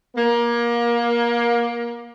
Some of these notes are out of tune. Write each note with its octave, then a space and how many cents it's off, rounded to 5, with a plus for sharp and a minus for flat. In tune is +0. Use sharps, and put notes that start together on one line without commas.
A#3 +25